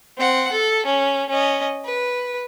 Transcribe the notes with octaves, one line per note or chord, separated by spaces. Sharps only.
C4 F#5
A4
C#4
C#4 D#5
B4